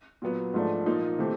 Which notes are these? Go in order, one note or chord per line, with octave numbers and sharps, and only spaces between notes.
A#2 F#3 B3
G#2 F3 A3 D4
A#2 F3 A#3 D#4
C3 E3 A3 C4